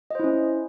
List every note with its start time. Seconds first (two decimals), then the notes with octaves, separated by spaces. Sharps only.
0.11 D#5
0.15 C5
0.20 E4
0.24 C#4